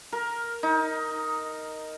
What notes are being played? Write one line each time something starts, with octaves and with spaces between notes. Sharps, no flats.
A#4
D#4